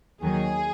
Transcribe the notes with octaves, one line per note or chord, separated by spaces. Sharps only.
D#2 D#3 F#3 G#4